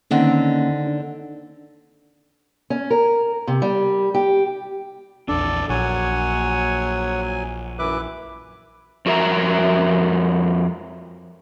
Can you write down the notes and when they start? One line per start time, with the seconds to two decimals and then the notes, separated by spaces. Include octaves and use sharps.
0.11 D3 D#3 A#3 C4 C#4 F#5
0.87 D4
2.70 C#4
2.90 A#4
3.48 C3
3.62 G3
4.14 G4
5.29 A#1 E2 D4 A4 D5
5.69 A#1 F#3 C#5 F#5 G#5
7.79 F#2 E3 B4 E5 D6 F#6
9.06 F2 F#4 A#4 E5 A#5